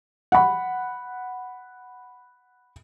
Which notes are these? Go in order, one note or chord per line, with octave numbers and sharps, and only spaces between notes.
F#5 B5